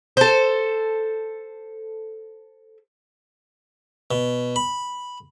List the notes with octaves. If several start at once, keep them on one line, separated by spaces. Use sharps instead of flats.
A4 C5
B2
B5